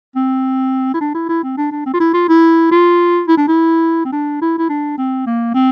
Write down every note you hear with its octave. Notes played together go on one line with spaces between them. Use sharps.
C4
E4
D4
E4
E4
C4
D4
D4
C4
F4
E4
F4
E4
F4
E4
D4
E4
C4
D4
E4
E4
D4
C4
A#3
C4